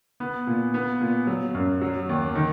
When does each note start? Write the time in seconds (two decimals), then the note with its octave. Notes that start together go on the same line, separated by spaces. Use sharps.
0.20 B3
0.47 A#2
0.74 B3
1.01 A#2
1.27 F#3
1.54 F#2
1.81 F#3
2.09 D#2
2.35 D#3